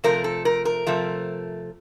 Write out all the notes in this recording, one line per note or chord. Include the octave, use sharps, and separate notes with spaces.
C3 F3 A3 A#4
A4
A#4
A#4
C3 F3 A3